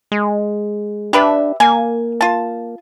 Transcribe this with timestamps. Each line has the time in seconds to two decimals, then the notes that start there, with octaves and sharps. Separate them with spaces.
0.12 G#3
1.13 D4 G4 B4 E5
1.60 A#3 G#5
2.21 F4 A5